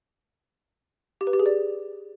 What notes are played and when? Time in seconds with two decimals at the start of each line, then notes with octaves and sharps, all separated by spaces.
1.21 G4
1.27 B4
1.33 G4
1.39 G#4
1.46 D5